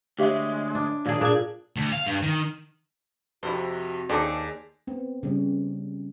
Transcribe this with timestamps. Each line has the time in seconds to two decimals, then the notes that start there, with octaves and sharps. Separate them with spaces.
0.19 D2 G#3 G4 C#5 E5
0.75 D4
1.06 D#2 A#2 D4 G#4
1.21 A#2 D4 G#4 G#6
1.76 D2
1.93 F5
2.07 G2
2.22 D#3
3.43 F2 C3 E4 F#4 C5
4.09 D#2 D#4 G#4 A4 C5 D5
4.87 B3 C4
5.23 C#3 G3 C#4